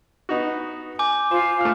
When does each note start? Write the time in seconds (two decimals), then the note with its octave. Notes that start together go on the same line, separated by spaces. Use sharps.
0.29 B3 D#4 F#4
0.99 G#5 D6 G6
1.31 F4 C5 F5
1.61 A3 F6